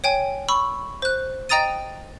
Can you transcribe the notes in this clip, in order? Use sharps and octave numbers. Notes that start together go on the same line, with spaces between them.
C#5 G5 G#5
B5 C#6 E6
C5 F#6
D#5 G5 A#5 D#6 A6 D#7